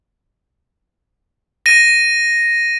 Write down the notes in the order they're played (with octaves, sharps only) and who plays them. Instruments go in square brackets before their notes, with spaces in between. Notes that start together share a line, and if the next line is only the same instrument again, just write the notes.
[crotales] A#6 D#7